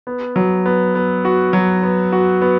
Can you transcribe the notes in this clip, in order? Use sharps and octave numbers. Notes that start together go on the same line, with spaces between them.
B3
F#3
B3
B3
F#4
F#3
B3
F#4
B3